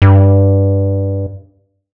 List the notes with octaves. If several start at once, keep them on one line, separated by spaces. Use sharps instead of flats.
G2